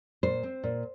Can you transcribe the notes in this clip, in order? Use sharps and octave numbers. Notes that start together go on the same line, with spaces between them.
A#2 C5
C4
A#2